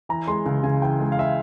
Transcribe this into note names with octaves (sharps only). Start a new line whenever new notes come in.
E3 A#5
G#3 C6
C#2
C#3 G#5
E3 G5
G#3
F5
E5